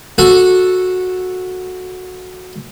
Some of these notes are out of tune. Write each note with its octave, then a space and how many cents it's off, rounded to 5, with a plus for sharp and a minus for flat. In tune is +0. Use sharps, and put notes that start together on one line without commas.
F#4 -10 A4 +0